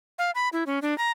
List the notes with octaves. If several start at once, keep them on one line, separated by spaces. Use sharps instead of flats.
F5
B5
E4
C#4
D4
A#5